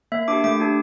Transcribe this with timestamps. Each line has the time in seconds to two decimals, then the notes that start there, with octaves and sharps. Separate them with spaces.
0.12 A#3 E5
0.28 D4 G4 D6
0.44 A3 D6
0.60 D4 G4